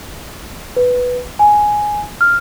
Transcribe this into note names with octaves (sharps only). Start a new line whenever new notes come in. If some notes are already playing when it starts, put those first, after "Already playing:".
B4
G#5
F6